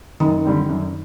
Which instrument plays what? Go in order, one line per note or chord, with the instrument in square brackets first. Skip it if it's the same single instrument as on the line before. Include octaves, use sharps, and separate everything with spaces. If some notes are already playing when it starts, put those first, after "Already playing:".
[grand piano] F#2 [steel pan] D#3
[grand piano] D3 G3 C4
F#2